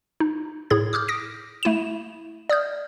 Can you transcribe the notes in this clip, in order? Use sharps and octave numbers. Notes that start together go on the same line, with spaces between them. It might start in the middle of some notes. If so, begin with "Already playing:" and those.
D#4
A2 G#4 G#6
D6 D#6 F6 G6
D#6 A#6 D7
A3 E4 D#7 E7
D5 D#6 F6 G6